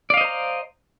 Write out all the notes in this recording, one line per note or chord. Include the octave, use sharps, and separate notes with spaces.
C5 D5 D#5 F5 A#5